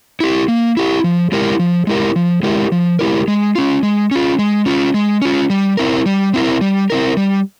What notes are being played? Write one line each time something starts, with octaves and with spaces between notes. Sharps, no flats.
E4 G4
A#3
E4 G4
F3
G#3 E4 G4 A#4
F3
G#3 E4 G4 A#4
F3
G#3 E4 G4 A#4
F3
G#3 E4 G4 A#4
G#3
C#4 F4
G#3
C#4 F4
G#3
C#4 F4
G#3
C#4 F4
G3
C4 E4 A#4
G3
C4 E4 A#4
G3
C4 E4 A#4
G3